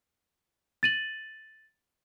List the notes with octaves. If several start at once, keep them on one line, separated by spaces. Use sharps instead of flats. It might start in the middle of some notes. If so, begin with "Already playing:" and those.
A6 D#7 F#7